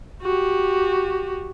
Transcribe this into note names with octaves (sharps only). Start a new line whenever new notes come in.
F#4 G4